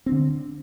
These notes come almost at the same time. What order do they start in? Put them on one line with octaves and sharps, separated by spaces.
C4 D4 D3